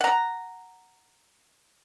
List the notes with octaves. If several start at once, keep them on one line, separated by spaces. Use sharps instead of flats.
F#5 A#5